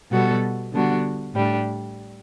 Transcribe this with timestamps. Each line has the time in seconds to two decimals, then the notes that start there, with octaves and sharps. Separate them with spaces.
0.11 B2 G3 B3 F#4 A4
0.73 D3 G3 B3 D4 F#4
1.34 A2 G3 D4